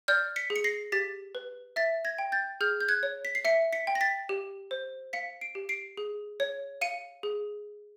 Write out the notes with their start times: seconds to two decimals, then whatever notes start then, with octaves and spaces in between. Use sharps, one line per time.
0.08 D5 F6 G6
0.36 B6 C#7
0.50 G#4
0.56 C#7
0.64 A#6 C7
0.92 G4 A6 B6
1.35 B4
1.76 E5 A6 B6
2.05 G#6 A#6
2.18 G5
2.32 G6 A6
2.61 G#4 F6 G6
2.81 G6
2.88 F#6 G#6
3.03 C#5
3.25 B6
3.35 C7
3.45 E5 B6 C#7
3.73 B6 C#7
3.87 G5
3.95 A#6
4.01 A6 B6
4.29 G4
4.71 C5
5.13 F5 B6 C#7
5.41 C7 D7
5.55 G4
5.69 C7 D7
5.97 G#4
6.40 C#5
6.81 F5 C#7 D#7
7.23 G#4